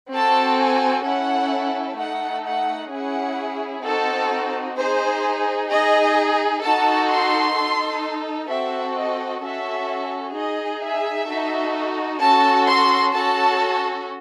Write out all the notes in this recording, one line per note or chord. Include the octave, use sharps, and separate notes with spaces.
C4 F#4 A4 A5
G#5
C#4 E4 A4 F#5
A3 D#4 A4 F#5
F#5
C#4 E4 G#4 F#5
C4 D#4 F#4 A4
D#4 G#4 C5
D#4 G#4 D#5
D#4 F#4 A4 A5
C6
D#4 A4
C4 F#4 A4 E5
D#5
C#4 F#4 A4 E5
D#4 G#4 D#5
E5
D#4 F#4 A4
C#4 F#4 A4 A5
C6
C#4 F#4 A4 A5